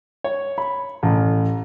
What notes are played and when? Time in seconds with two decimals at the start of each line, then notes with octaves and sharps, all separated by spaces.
0.24 C#5
0.58 B5
1.03 A1